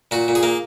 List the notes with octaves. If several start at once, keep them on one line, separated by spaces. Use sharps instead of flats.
A#2 F#4
A#2
G#4
A#3